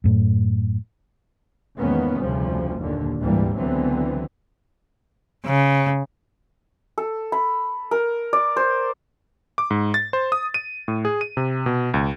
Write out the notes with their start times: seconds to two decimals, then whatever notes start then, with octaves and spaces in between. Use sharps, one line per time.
0.04 F#2 A2
1.80 E2 G#2 D#3 A#3 B3 C#4
2.18 F1 D2 C#3 F3 G3
2.78 F#1 D#2 A#2 D3
3.20 G#1 D2 G#2 E3 G3 A#3
3.57 C#2 D3 E3 F#3 B3 C4
5.45 C#3
6.98 A4
7.32 B5
7.91 A#4
8.33 D5
8.57 C5
9.58 D6
9.71 G#2
9.94 A6
10.13 C5
10.32 D#6
10.54 D#7
10.88 A2
11.05 G#4
11.21 D#7
11.37 C3
11.66 B2
11.94 C#2